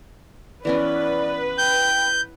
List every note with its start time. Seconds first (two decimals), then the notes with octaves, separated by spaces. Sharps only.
0.65 E3 B3 C#4 B4 D5
1.58 G5 G6